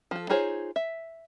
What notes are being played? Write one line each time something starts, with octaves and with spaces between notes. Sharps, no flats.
F3 A4
D#4 F4 G#4 C5 C#5
E5